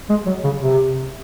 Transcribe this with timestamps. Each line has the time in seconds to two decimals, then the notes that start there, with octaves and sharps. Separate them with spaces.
0.09 G#3
0.26 F#3
0.44 C#3
0.62 C3